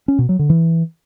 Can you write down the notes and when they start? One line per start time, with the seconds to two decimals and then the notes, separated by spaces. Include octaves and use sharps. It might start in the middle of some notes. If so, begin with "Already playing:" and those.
0.08 C#4
0.19 B2
0.29 F#3
0.39 D3
0.50 E3